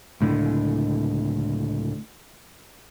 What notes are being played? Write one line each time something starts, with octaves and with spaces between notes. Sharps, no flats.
C#2 A2 D3